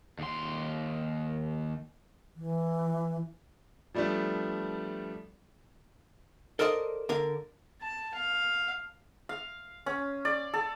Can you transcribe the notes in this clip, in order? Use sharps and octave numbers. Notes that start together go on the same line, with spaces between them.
D#2 C6
E3
F3 G3 A3 B3 D4
A4 A#4 C5 D5 D#5 F5
D3 A#4 F5
A5
F5
F5
C#4
D5
A4